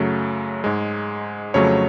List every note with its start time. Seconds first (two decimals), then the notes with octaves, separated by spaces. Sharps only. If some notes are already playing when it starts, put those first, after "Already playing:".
Already playing: F#2 C#3 F#3 A3
0.64 G#2 G#3
1.54 F2 C#3 F#3 A3 C#5